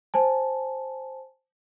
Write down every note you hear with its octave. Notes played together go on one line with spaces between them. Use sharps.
C5 G#5 A5